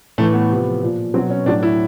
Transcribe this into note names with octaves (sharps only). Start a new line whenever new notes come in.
A2 E3 A3
B3
C3 F3
A#2 F3
B2 F#3 C4
C#4
A2 F#3 D4
E4